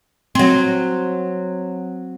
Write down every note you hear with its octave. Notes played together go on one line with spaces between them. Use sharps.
F#3 C4